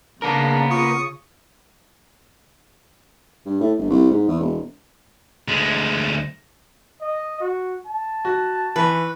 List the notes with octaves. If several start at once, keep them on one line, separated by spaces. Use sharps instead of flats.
C#3 A#3 B3 D4 A#4
F4 C#6 D#6
G2
A2
G1
C2
G#2
E2
E1
D2 G#3
D#5
F#4
A5
F#4
E3 B4 C#6